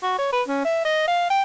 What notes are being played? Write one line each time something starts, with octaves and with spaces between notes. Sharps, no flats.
F#4
C#5
B4
C#4
E5
D#5
F5
G5